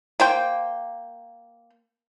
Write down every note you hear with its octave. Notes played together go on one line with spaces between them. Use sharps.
A#3 C5 G5